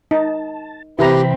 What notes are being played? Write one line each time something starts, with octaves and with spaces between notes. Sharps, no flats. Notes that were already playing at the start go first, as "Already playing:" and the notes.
D#4 A5
C3 E3 C4 E4 G4 B4 A#5 B5